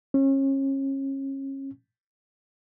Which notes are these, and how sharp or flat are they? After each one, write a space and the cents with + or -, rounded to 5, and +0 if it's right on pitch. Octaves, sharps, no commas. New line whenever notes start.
C#4 -30